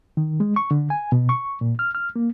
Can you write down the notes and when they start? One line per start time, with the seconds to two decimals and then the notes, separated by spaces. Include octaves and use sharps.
0.17 D#3
0.40 G#3
0.56 C#6
0.71 D3
0.90 G#5
1.12 B2
1.29 C#6
1.61 A#2
1.79 F6
1.95 F6
2.16 A#3